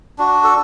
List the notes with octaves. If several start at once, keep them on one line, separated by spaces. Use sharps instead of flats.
D4 F#4
A4